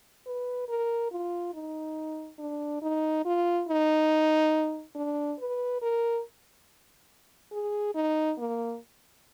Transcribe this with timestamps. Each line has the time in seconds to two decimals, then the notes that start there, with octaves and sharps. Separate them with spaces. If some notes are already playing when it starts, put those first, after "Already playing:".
0.27 B4
0.68 A#4
1.12 F4
1.54 D#4
2.39 D4
2.82 D#4
3.25 F4
3.68 D#4
4.95 D4
5.39 B4
5.82 A#4
7.52 G#4
7.95 D#4
8.38 A#3